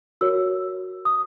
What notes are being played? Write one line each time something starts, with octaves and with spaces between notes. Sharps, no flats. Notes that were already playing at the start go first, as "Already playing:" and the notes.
F#4 A#4 C#5 E6
D#6